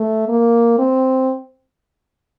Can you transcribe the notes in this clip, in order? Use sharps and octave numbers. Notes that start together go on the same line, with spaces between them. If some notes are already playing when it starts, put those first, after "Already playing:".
Already playing: A3
A#3
C4